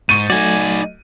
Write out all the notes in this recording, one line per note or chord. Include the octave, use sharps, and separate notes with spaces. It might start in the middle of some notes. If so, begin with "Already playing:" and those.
G#2 C#6 G6 A6 D#7
F#3 A3 D#4 F#4 D5 G#5